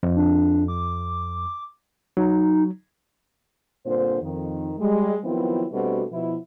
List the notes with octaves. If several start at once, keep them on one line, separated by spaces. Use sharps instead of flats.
F2
D4
D6
F#3 D#4
G2 A#2 D3 C4 C5
F2 D#3
G3 G#3
D#3 F3 F#3 B3 C4 E4
B2 G3 A3 C4 D4 F#4
B2 F3 E4